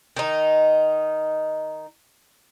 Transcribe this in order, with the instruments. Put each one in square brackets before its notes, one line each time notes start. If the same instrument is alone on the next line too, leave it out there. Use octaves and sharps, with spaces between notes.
[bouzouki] D#3 D#4